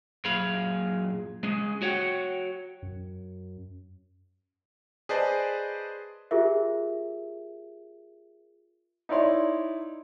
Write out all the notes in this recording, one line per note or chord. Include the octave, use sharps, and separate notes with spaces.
F#2 A#2 G#4 F5 B5
G#3 C#4 G#4
F#4 C#5 F#5 G5
F#2
G#4 B4 C5 D5 D#5 A5
F4 G4 G#4 A#4 E5
D#4 E4 C#5 D5 C6